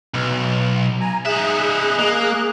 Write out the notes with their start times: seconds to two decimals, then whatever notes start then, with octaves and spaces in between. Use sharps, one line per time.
0.14 B1
1.00 G#5 A#5
1.26 D#4 G#4 E5 F#6
1.99 A#3